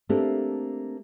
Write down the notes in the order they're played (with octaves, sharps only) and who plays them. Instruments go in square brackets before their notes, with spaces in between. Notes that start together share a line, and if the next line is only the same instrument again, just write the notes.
[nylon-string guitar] A3 A#3 C4 D4 G4 A4